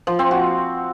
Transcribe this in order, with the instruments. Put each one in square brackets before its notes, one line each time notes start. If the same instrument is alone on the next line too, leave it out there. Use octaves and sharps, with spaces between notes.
[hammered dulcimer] F3
C4
F#4